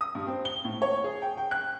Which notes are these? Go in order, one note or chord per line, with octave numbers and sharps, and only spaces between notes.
D#6
G2
C4
G7
A2
C#5
G#4
G5
G5
F#6